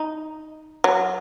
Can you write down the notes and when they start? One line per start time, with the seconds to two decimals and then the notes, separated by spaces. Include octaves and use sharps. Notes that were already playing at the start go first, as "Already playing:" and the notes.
Already playing: D#4
0.84 F#3